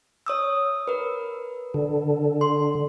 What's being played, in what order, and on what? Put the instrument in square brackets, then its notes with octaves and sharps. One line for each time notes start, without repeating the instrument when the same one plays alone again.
[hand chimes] C#5 D#6 E6
A#4 B4
[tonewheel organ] D3
[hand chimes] C6